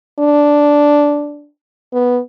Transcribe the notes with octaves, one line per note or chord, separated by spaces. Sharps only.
D4
B3